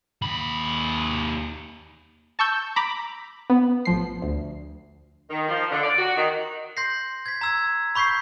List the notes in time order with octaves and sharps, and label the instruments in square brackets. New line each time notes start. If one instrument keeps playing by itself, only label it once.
[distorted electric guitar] D#2 B5
[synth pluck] A5 C#6 E6 G6
A#5 B5 D6
B3
A1 F3 C7
D2
[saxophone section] D#3
F3
D3
D5
F#4
D#3
[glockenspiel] C6 G6 A#6 C7
G#6 B6
A#5 E6 G#6
B5 C#6 G6 B6 C7